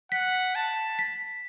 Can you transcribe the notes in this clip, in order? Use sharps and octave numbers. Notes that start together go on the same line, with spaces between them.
F#5 B6
A5
B6